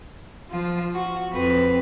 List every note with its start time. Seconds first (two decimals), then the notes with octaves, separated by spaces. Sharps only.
0.50 F3 F4
0.95 F#4
1.31 F2 C4 B4